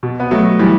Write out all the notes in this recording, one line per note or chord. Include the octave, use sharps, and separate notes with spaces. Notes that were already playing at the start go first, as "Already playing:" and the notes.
B2
B3
F#3 A3
E3 G3